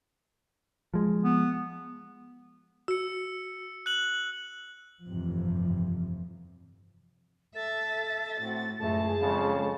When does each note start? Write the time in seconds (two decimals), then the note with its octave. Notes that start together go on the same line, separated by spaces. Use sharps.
0.94 F3 G#3
1.23 B3
2.88 F#4 E6 C#7
3.86 F#6 F#7
5.05 G1 F2 A2 C3 E3 F3
7.56 A4 E5 A6
8.41 A2 A3 C4 F#4
8.80 C#2 F#2 A2 A3 G#4 A5
9.20 F2 C#3 G#3